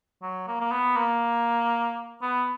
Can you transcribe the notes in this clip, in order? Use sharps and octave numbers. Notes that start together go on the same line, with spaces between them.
F#3
A#3
A#3
B3
A#3
B3